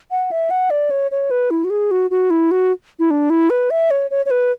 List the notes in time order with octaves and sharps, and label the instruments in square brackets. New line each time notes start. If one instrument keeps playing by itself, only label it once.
[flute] F#5
E5
F#5
D5
C#5
C#5
B4
E4
F#4
G#4
F#4
F#4
E4
F#4
E4
D4
E4
B4
E5
C#5
C#5
C#5
B4